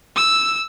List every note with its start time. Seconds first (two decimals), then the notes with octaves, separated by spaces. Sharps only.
0.16 E6